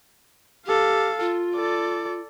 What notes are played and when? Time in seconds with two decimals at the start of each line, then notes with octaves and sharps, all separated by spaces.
0.66 G4 A4 F5
1.20 F4
1.55 A4 D5